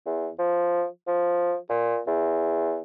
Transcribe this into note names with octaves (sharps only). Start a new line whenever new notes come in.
E2
F3
F3
A#2
E2